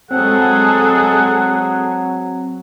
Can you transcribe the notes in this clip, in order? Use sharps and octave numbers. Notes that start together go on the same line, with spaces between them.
F#3 G#3 C4 G#4 A4 F#5